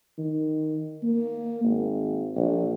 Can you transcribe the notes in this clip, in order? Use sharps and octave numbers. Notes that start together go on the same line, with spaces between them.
D#3
A#3
G#1
A#1